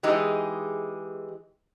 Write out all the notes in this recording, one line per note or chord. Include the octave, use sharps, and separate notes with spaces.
E3 G#3 D#4 G4 G#4